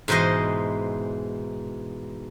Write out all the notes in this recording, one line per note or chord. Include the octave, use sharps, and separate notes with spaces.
G#2 B2 E3 C5 D#5